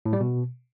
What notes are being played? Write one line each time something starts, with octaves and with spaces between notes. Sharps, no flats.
A2
G3
B2